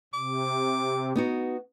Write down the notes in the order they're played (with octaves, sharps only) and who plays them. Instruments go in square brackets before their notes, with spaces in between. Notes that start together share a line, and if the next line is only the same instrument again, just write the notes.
[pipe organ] C3 [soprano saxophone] D6
[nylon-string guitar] B3 D#4 F#4